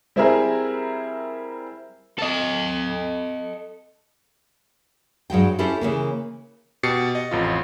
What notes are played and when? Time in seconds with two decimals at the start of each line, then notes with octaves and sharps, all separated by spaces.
0.16 G3 C4 E4 G#4 A#4 E5
2.18 A4 D#5
5.30 G2 F#3 G#3 G5
5.59 C#4 E4 G4 A4 C5
5.81 C#3 E3 A#3
6.83 B2 G4 A6 C7 C#7
7.15 D#5
7.31 A1 F2 F4